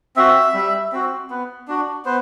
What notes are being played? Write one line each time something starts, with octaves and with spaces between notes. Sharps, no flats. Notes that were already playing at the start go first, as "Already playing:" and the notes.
C4 F#4 E5
G3
C4 F#4
B3
D4 F#4
B3 C5